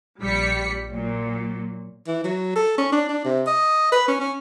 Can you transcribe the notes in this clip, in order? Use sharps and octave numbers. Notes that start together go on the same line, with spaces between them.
A#1 G3 B6 C#7
A#2 F#3
E3
F#3
A4
C#4
D4
D4
C3
D#5
B4
C#4
C#4